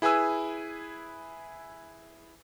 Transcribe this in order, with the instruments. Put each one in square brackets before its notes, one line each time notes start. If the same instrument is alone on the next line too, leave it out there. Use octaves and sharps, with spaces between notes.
[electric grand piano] E4 G#4 B4 G#5 E6